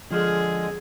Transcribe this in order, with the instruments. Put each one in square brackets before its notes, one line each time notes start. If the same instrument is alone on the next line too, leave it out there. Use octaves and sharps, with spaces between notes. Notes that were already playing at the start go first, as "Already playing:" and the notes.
[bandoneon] D3 G#3 [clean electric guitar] F3 [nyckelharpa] G#4